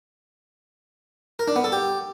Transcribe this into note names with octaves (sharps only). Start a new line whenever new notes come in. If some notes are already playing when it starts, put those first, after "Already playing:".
A#4
D4
B3
A4
G4